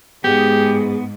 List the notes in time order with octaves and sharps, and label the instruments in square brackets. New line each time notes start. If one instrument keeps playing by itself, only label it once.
[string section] G#2 [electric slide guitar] B3 [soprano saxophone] G4 [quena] G#4